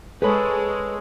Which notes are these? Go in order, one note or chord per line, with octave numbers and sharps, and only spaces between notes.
G#3 G#4 A4 B4 C#5 B5